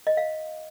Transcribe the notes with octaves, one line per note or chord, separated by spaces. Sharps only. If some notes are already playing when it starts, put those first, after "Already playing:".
D#5
F5